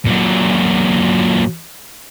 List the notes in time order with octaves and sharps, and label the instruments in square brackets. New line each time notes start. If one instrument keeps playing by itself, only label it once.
[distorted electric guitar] A#2 F#3